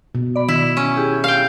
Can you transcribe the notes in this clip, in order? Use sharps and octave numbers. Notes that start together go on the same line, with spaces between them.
B2
D5 B5
D#3 E4
C#4
E4 G4 G#4
F5 G5